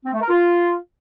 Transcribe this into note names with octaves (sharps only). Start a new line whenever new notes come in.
C4
A3
A#4
F4